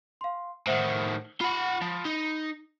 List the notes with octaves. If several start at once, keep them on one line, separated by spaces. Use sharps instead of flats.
F5 C6
A2 D#3 C5 E5 F#5
F4 F#5 B5
F3
D#4